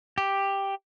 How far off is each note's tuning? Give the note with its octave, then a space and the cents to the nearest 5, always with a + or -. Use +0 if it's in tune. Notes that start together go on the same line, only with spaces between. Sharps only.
G4 +5